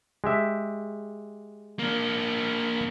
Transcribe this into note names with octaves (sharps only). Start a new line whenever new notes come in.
G#3 G4 E5
A#3 D4